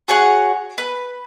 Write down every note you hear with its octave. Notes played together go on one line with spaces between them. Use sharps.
F#4 G#4 C#5 F#5
B4